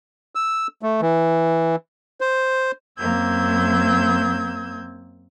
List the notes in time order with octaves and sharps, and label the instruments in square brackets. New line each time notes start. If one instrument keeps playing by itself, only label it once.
[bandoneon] E6
A3
E3
C5
[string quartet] F#2 A#3 C4 E6 G6 G#6